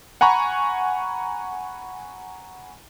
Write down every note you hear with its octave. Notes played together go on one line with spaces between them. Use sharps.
F#5 G#5 A#5 B5 C#6